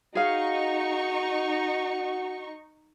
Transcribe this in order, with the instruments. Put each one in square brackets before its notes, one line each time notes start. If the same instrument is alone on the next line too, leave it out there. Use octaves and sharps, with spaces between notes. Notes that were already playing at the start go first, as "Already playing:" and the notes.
[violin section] D#4 C#6 [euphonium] F#4 [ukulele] G#4 F5